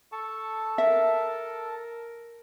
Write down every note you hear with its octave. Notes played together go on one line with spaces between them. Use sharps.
A4 A5 C#6
A#4 E5